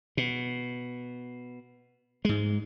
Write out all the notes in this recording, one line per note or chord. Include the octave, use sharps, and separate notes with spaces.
B2
G#2 G#3